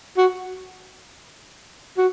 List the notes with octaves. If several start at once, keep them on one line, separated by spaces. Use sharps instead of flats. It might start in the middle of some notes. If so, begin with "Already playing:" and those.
F#4
F#4